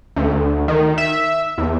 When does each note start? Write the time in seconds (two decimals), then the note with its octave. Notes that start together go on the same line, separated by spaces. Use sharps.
0.16 D2
0.68 D#3
0.98 E5
1.58 E2